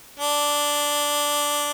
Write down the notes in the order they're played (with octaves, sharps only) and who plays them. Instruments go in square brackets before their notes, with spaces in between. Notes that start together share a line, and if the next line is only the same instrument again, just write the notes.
[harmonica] D4